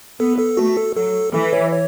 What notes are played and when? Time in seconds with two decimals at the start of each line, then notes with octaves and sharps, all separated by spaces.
0.20 B3 A4
0.39 A4
0.57 A3 F#4
0.77 A4
0.95 F#3 A4
1.33 E3 A4
1.53 C#5
1.72 C#5